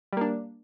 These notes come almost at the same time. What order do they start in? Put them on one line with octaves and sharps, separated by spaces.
G3 A#3 D4